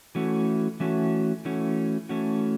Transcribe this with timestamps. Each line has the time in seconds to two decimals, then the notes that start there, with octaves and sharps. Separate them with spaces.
0.15 E3 A3 C#4 F#4
0.80 E3 A3 C#4 F#4
1.45 E3 A3 C#4 F#4
2.09 E3 A3 C#4 F#4